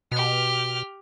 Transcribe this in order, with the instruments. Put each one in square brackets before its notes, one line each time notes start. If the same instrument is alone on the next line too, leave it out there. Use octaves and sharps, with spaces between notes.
[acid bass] B2 [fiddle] G4 F6